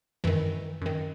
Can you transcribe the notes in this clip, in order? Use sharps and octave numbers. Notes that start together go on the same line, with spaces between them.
F#2 D#3 E3 E4
F#2 D#3